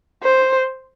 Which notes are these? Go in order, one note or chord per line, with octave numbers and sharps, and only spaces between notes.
C5